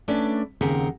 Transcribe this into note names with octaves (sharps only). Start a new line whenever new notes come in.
A3 C#4 D4 B4 D5
D#2 C#3 C4 A#4 F#5